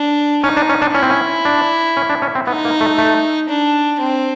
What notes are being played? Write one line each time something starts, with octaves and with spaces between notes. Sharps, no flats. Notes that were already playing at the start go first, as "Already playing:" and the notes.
Already playing: D4
C#4 D#4
D4
C#4
D4
C#4 E4
C4
C#4
D4
C#4
D4
C#4
C4
B3 D#4
A#3
A3
A3
D4
C4